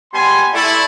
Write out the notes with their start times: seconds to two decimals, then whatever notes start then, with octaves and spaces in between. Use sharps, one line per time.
0.13 G3 B3 G#5 C6
0.53 A3 E4 D5